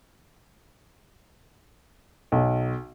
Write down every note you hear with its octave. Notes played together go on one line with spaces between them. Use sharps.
B1